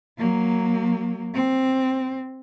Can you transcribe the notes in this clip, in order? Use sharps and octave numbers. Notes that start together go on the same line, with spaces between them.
F#3 A#3
C4